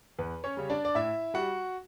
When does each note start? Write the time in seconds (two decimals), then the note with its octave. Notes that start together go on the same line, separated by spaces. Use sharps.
0.19 E2 B4
0.44 C#4 C#5
0.57 C#3 G3
0.70 D4 D5
0.85 D5
0.95 A2 E4 E5
1.34 G3 F#4 F#5